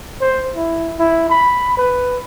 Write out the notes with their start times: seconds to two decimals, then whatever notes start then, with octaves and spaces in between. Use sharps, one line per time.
0.21 C5
0.55 E4
0.99 E4
1.30 B5
1.77 B4